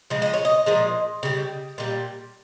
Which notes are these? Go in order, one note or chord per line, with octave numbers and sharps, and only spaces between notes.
C#3 F3 G#3
D#5
C#5
D#5
A#2 F3 G#3
C#3 G3
A#2 G3